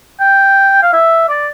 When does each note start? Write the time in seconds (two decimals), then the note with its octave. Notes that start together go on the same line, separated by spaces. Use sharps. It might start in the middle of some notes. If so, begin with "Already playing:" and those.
0.20 G5
0.82 F5
0.93 E5
1.29 D5